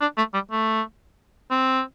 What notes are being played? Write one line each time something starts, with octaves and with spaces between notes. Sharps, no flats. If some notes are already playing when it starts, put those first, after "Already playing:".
D4
A3
G3
A3
C4